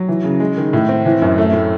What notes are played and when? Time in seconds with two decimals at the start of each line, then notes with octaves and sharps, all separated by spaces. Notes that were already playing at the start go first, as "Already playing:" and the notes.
Already playing: F#3
0.08 E3
0.24 C#3
0.40 G#3
0.57 D#3
0.73 A2
0.89 C4
1.06 E3
1.22 F#2
1.38 A3
1.53 A2